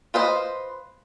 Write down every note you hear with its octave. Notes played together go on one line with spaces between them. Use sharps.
F4 B4 C5 D#5